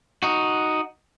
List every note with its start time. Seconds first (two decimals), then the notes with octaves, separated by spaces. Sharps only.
0.23 D#4 F#4